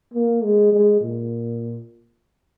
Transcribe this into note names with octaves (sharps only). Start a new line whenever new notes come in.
A#3
G#3
G#3
A#2